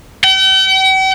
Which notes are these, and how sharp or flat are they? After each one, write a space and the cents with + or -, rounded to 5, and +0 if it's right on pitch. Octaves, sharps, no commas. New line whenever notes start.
G5 -45